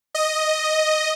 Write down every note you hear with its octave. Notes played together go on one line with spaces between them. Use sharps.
D#5